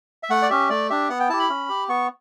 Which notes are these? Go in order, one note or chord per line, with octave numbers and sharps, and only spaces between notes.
E5
A3 F#5
D5
C#4 G4 E5
A3 D5
D4 G4 E5
B3 F#5
G5
E4 G4 A5
B5
C#4
G4
B3 C#6